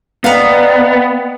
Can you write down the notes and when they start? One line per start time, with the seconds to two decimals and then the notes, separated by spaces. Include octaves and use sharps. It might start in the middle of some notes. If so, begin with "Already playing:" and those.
0.24 B3 D5 D#5 F5 G5 A#5